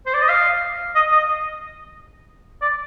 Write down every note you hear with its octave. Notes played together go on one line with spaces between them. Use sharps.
C5
D5
D#5
F5
D#5
D#5
D5